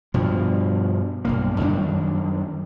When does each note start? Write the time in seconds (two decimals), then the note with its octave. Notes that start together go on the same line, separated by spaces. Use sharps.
0.14 G2 B2 F3
1.25 B1 G2 A#3
1.60 F#2 D#3 G3 D4